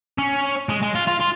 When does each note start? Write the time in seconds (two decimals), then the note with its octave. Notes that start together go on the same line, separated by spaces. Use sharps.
0.18 C#4
0.69 G#3
0.82 G#3
0.95 F4
1.07 F4
1.20 F4